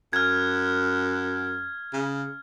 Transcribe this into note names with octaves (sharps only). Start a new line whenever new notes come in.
F#2 F6 G#6
C#3